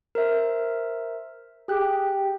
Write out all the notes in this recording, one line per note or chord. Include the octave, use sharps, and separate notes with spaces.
A#4 C5 E5
G4 G#4 F#6